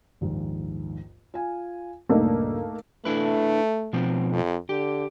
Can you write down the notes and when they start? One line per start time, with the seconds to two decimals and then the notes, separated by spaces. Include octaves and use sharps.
0.21 A#1 D#2 G#2
1.34 F4 G#5
2.09 C#2 G2 A#2 A3 A#3 D#4
3.05 A3 D4 E4 B4
3.93 B2 F3 C4
4.32 F2
4.69 D3 G4